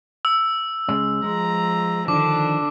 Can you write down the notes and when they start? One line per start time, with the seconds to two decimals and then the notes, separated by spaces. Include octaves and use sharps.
0.25 E6
0.88 C#2 G#3 C#4
1.24 F3 G#3 A#5
2.08 D3 D#3 F3 D4 D6